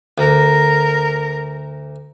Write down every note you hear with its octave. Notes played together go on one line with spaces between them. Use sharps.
D2 A#4